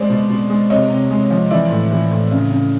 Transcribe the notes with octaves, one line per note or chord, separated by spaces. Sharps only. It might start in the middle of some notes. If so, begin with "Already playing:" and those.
Already playing: G#3 C5 D5
B2
B2
G#3
C3 C#5 D#5
C3
G#3
F3
E3 D5 E5
A2
E3
A2
C#3
C#3